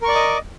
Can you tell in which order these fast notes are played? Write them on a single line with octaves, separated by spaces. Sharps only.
A#4 C#6 D5 D6 D#5